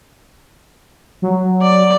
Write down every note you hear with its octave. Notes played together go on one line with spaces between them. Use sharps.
F#3
D5